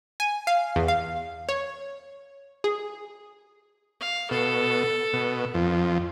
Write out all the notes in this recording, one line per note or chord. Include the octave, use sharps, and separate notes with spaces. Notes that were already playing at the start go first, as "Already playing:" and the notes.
G#5
F5
E2
F5
C#5
G#4
F5
B2 A4
B2
F2